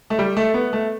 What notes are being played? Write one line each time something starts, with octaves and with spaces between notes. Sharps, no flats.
A3
G3
A3
B3
A3